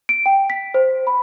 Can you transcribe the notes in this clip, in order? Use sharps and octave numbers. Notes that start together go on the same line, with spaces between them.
D7
G5
B6
C5
B5